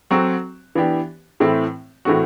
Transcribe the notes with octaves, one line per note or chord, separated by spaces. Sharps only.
F#3 C4 F#4 A4
E3 B3 D4 G4
A2 E3 A3 C4 E4
A2 E3 A3 C4 F#4